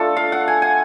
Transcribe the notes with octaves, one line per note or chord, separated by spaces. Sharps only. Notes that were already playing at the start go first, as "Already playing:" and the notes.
Already playing: A3 D4 F4 A4
F5
F#5
G#5
G#5